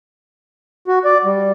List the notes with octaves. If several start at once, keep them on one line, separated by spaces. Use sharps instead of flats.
F#4
D5
G3